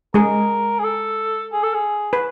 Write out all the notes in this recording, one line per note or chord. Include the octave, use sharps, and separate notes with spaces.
G#3 G#4 A#4
G#4
A4
G#4
A4
G#4
B4